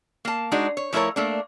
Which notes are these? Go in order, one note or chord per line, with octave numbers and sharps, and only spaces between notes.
A#3 A5
G#3 D4 D#4 F#4
C#5
F3 A3 E4 G#4 A#4 C#5
A3 A#3 D4